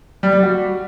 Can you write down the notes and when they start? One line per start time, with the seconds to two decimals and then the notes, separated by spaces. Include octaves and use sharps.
0.23 G3
0.33 G3
0.43 F#4